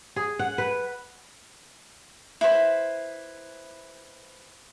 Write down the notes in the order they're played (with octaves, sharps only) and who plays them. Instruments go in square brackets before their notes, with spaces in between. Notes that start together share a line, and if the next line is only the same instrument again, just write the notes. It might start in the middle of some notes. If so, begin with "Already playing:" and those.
[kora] G#4
F#5
B4
[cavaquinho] E4 B4 C5